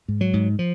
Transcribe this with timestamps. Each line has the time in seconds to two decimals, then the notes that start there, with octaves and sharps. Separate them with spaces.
0.08 G#2
0.21 F#3
0.33 G#2
0.59 F3